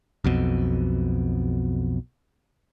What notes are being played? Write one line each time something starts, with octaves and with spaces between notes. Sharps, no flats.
B1 F2 B2